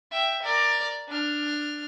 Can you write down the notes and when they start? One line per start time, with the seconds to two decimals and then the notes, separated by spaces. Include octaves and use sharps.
0.12 E5 G5
0.43 A#4 D5
1.08 D4 F6